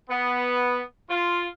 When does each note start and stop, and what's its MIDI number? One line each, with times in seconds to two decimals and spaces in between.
0.10 0.82 59
1.10 1.47 65